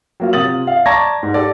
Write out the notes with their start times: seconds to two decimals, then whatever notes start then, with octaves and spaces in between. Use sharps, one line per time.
0.20 F#3 A#3 F4
0.33 C3 F4 D#6 A6 F#7
0.67 E5 F5
0.86 D5 A5 A#5 C#6 G#6 A#6
1.23 G#2
1.34 G4 A4 D5